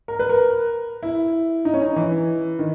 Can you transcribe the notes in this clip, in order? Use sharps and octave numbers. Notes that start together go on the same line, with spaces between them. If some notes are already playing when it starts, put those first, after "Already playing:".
A#4
B4
A#4
E4
D#4
C#4
D#4
E3
D#3